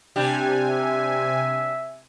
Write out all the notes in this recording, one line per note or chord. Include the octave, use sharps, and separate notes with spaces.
C3 G3 D4 G4 G#5
E5